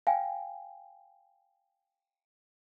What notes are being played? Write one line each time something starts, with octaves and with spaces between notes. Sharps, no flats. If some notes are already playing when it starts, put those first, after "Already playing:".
F5 G5 G#5